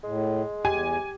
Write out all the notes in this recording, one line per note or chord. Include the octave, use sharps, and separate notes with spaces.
A2 G#3
E2 G4 G#5